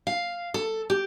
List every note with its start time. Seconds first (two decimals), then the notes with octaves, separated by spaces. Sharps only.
0.07 F5
0.54 A4
0.90 G4